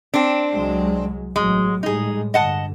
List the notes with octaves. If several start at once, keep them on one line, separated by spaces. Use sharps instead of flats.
C4 D4
C2 F#3 G#3
A1 F#3 G#3
A2 G3 G#3 D#4 G#4
G2 D3 D#5 F#5 A5